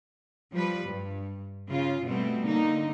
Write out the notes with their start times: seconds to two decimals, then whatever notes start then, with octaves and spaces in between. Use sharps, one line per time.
0.53 F3 G3 B4
0.88 G2
1.69 C#3 F4
2.05 B2 G3 A3 B3 C4
2.47 D3 A#3 D#4